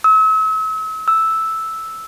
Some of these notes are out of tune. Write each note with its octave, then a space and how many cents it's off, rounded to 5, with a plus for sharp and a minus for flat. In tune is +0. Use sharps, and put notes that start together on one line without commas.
E6 -40
E6 -5